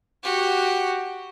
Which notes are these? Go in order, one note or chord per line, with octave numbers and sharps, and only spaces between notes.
F#4 G4